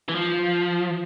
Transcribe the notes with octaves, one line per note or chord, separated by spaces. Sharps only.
E3
F3